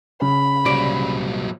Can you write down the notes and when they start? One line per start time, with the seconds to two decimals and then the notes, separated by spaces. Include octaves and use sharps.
0.22 C#3 B5
0.66 C2 A#2 F#3 D5